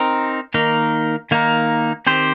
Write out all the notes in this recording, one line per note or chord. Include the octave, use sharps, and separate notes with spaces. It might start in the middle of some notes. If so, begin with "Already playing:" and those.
Already playing: C4 D#4 A#4
D#3 A#3 D#4 A#4
D#3 A#3 D#4 A#4
D#3 C4 G4 C5